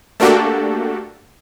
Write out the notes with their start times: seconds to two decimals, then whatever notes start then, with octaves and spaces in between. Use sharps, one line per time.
0.20 A3 A#3 D4 F#4 G4 A4